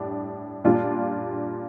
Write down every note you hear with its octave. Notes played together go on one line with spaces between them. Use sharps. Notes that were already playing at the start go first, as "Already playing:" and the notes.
Already playing: A2 G3 D4
A#2 G3 D4 F4